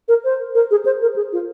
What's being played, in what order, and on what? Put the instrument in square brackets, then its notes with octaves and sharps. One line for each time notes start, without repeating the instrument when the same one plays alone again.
[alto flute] A#4
C5
A#4
G#4
C5
A#4
G#4
F4